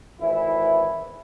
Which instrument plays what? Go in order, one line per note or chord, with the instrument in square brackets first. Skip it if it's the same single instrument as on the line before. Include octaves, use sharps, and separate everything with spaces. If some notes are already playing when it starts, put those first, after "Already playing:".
[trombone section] G#1 E3 E4